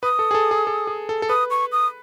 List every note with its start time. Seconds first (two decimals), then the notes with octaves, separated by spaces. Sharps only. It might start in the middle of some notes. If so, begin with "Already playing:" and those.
0.03 B4 D#6
0.19 A4
0.31 G#4
0.35 A4
0.51 G#4
0.67 A4
0.87 G#4
1.09 A4
1.22 A4
1.29 B4 D#6
1.51 C#6
1.72 D#6